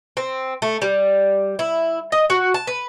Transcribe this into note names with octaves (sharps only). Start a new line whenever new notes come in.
C4
A3
G3
E4
D#5
F#4
A5
B4